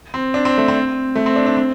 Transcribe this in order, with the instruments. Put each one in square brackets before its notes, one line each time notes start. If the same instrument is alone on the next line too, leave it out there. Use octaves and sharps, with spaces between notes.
[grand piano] C4
D4
C4
A3
C4
A3
C4
D4
D4
C4